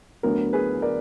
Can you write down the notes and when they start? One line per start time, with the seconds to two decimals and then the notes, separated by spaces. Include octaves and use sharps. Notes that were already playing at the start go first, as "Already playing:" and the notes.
0.23 D2 D3 F#3 B3 A#4
0.53 G#4 B4
0.82 A#4 D5